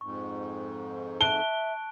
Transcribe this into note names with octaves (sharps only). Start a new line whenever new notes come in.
F2 G#2 C#6
E5 A5 F#6 D7 G7